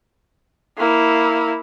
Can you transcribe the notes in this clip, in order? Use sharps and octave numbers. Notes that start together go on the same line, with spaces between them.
A#3 E4